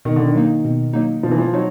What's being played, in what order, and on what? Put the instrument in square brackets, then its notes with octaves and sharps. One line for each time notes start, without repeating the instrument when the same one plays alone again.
[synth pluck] B2 [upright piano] D#3
[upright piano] D3
D#3
[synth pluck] F#3 A#3 D#4
B2
F#3 A#3 D#4
[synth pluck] B2 [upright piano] F3
[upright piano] E3
F3
[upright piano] F#3 [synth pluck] D#4